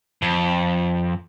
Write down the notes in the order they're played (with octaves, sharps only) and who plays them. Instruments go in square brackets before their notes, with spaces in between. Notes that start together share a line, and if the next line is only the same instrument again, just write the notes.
[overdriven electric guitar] F2